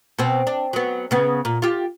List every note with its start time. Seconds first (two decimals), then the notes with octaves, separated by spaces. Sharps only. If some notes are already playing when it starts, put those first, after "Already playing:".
0.19 B2 C4
0.47 D4
0.73 F#3 B3
1.11 C#3 B3
1.45 A#2
1.62 F4 G4